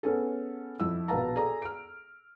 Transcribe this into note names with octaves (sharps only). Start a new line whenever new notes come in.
B3 C#4 G#4 A4
F2 E4 E6
A#1 B2 B4 F5 A5 A#5
G#4 A4 D5 A#5
F6 D7